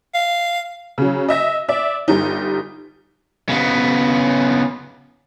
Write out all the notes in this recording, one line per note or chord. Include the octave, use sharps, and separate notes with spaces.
F5
C#3 F#3
D#5 E5 A#6
D5 E5
G1 G3 D#4
C#3 B3